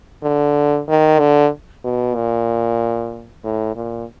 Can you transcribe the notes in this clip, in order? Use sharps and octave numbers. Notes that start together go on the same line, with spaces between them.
D3
D#3
D3
B2
A#2
A2
A#2